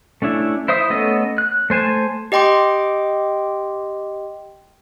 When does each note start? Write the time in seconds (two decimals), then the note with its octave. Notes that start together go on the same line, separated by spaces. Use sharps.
0.22 A3 C#4 D4 E4
0.68 E4 C5 E5 D#6
0.90 A3 B3 C#4 A4 D#5
1.38 F#6
1.70 A3 C5 G#5 A5
2.32 G4 D#5 G5 C6 D6